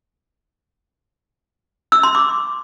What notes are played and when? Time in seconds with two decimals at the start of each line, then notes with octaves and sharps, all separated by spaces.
1.92 E6
2.03 C6
2.15 D6